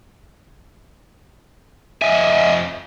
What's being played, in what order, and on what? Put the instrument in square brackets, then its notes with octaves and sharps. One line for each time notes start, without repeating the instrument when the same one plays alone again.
[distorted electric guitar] F2 G#5 [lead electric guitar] D#5 E5